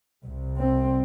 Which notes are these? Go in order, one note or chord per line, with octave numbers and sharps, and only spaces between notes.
C2 C3
C4